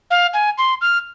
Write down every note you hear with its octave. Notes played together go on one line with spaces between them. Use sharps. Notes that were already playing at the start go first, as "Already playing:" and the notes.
F5
G#5
C6
F6